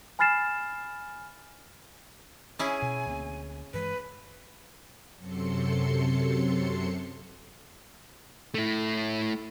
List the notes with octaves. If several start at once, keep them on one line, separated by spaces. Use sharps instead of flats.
G#5 B5 F6 A6 C7 E7
C#4 E4 G#4 G#5
B2
D2 A#3 C4
G2 E3 G#3 B4
F#2 C3 F#3 A4 C6 C#7
A3 E4